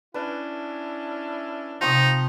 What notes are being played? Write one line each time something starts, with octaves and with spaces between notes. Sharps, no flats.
C#4 D4 E4 B4
C3 F3 C4 D#4 C#6